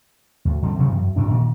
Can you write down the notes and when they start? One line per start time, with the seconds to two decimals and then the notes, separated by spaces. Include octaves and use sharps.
0.45 D2
0.62 D3 G3 C4
0.78 C3 E3 F#3 C4
0.91 F#2
1.16 A1 G#2 D4
1.30 A#2 D#3 A#3